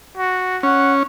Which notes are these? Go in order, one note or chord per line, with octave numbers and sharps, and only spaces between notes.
F#4
C#4 F#5